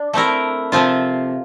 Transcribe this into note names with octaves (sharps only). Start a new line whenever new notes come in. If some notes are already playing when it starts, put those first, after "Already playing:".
Already playing: D4
A3 C4 E4 A#4
C3 F3 C4 F4